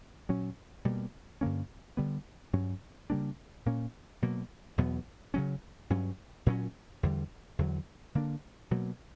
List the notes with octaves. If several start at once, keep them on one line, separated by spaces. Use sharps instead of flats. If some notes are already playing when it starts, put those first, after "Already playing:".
A#2 F#3 C#4
B2 G3 A#3
G2 D3 A#3 C#4
D3 G3 B3
G2 F#3 C#4
C#3 G3 A#3 D4
A#2 A#3 C#4
B2 F#3 A#3
E2 B2 F#3 B3
C#3 F#3 C#4
G2 F#3 C#4
A#2 F#3 C#4
E2 D3 G3
E2 D3 F#3
D3 A#3 D4
B2 F#3 A#3